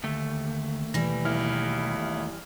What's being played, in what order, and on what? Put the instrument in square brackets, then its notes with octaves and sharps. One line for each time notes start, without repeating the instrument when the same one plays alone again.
[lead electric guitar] D#2 A3 [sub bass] D3
[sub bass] B2 [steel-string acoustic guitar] E3 G3 [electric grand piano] A#6
[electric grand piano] B1 E4 F6